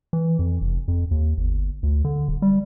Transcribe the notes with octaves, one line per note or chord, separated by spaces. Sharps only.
E3
F2
F1
F2
D#2
G1
D2
D3
D#1
G3